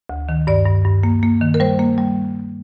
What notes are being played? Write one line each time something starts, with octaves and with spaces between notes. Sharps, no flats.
D2
D#3
G2 D5
G2
G2
A#3
A#3
D#3
A#4
G3 C5
A#3
G3